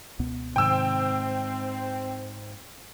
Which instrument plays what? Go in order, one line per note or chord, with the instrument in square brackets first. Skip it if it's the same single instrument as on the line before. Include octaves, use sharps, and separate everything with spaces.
[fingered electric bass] C#2 B2 B3
[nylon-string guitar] G#2 G#5 [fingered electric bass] C3 D#3 [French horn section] C4 [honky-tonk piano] G5 E6